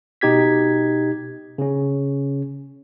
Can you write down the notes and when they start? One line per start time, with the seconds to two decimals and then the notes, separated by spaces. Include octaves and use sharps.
0.21 B2 D#4 G4 G#6 B6
1.58 C#3 C#4